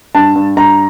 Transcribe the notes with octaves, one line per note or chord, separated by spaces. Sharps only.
G2 A5
G2
G2 A#5